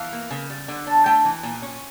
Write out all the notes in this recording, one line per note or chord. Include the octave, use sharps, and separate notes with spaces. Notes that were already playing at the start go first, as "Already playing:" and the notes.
Already playing: E3 F5
A#3
C#3
G3
D3
D4
A3 G5
E3
A#2
C#4